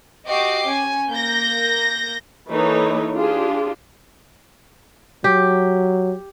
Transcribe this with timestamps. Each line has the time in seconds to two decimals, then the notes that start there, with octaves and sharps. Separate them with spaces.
0.28 F#4 G4 D#5 D6 C7
0.66 C#4 G#5
1.10 A#3 G6 A#6
2.50 E3 A#3 D#4 A4 B4 C#5
3.14 D4 F4 G4 G#4
5.24 F#3 G4